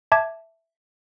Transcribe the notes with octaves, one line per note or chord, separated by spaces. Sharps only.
E5 A5 D6 G#6